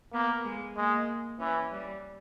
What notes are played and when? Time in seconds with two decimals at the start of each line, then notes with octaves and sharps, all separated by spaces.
0.13 A#3 B3
0.45 G#3
0.76 G#3 A#3
1.39 E3 C#4
1.71 G3